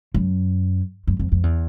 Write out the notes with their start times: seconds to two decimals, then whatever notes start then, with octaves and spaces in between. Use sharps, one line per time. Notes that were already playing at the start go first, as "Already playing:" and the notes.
0.14 F#2
1.07 F#2
1.19 F2
1.32 F2
1.43 E2